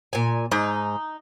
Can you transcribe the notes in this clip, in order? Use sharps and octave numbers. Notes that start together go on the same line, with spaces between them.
A#2 G#5
G#2 D#4